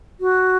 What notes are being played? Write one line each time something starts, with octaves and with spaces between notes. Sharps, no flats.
F#4